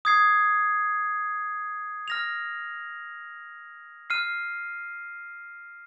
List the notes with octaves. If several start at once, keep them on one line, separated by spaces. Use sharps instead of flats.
D#6 G#6 C7
F6 A#6 F7
F6 C7 D#7